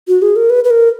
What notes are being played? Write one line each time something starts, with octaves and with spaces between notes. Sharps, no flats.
F#4
G#4
A#4
B4
B4
A#4